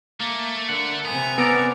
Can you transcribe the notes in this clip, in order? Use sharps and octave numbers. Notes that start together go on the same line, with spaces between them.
A3 A#3
D3 A#4 F#5
C3 B3 E5 G#5 A#5
B3 A4 A#4 D5